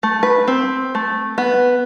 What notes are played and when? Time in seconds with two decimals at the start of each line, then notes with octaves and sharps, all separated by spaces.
0.03 A3
0.23 B4
0.48 C4
0.95 A3
1.38 B3